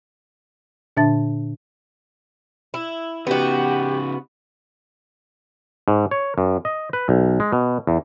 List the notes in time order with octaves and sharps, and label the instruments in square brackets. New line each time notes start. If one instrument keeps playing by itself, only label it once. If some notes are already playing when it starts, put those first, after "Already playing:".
[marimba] A#2 D3 D4 E5 A5 A6
[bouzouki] E4
[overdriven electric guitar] C#3 D#4 [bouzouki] B3 F#4 [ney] G4
[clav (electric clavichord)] G#2
C#5
F#2
D#5
B4
B1
G#3
B2
E2